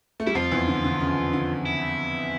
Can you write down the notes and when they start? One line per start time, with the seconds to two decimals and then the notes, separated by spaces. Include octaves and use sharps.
0.20 A3
0.27 G3 E4
0.35 F2 F3 F4
0.52 E2 E3
0.68 D3
0.84 D3
1.00 C#3
1.33 D3
1.66 E4